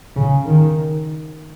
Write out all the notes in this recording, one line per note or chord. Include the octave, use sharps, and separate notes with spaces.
C#3
D#3